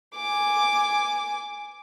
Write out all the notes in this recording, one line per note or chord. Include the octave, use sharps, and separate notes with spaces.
G#5 D6